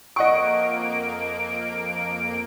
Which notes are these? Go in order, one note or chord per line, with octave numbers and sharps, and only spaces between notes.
F2 A#3 D#5 F#5 C#6 D7